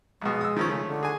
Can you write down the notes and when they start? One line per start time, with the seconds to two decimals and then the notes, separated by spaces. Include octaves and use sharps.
0.22 A#1 B2 G#3
0.41 D#6 E6
0.56 D#3 F3 C#4
0.69 C#3 A3
0.88 D3
1.03 G#4 G#5